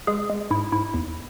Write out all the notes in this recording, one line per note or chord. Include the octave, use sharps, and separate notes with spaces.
G#3 G#4
G#3
G#2 E4
G#2 E4
E2